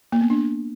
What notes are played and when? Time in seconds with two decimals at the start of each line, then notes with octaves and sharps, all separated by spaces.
0.12 A#3
0.21 B3
0.30 D4